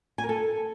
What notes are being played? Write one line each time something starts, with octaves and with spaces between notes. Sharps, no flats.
G#5
A#4
A4